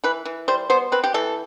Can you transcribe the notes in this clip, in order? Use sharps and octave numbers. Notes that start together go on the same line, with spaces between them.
E3 B4
E3
G3 C5
B3 C5
C4 B4
G4
E3 A4